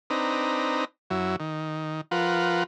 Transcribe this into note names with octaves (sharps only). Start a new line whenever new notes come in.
C4 D4 D#4 B4 A#5
F#2 F#3 E4
D#3
F3 F4 A#4 B4 F#5